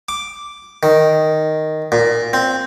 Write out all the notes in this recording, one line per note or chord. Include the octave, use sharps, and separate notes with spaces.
D6
D#3
A#2
C4